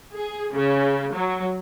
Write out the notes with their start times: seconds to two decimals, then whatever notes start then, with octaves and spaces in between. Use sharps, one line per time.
0.12 G#4
0.55 C#3
1.14 F#3